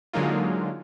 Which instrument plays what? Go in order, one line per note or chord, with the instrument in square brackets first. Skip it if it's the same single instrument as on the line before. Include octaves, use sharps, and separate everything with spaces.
[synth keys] D3 F#3 G#3 A#3 D#4 F4